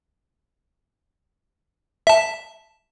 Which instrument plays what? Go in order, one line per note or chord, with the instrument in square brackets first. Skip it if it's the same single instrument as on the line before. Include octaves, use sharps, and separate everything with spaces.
[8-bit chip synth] E5 A5